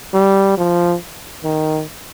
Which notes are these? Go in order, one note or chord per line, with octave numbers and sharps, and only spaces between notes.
G3
F3
D#3